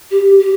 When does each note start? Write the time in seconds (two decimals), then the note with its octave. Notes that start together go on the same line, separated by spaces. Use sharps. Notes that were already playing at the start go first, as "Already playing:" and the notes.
0.11 G4
0.39 G4